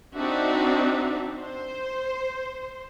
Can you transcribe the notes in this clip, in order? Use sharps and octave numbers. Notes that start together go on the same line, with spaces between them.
C4 D4 D#4 F#4 E5
C5